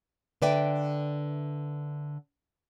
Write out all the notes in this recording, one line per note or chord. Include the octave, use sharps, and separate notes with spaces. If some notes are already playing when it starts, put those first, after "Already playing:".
D3 B4 D5 E5 G5